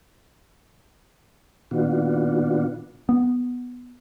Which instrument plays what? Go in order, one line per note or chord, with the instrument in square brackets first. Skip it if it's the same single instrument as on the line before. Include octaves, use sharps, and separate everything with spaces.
[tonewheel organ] A#2 D#3 B3 D4 F4 F#4
[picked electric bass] B3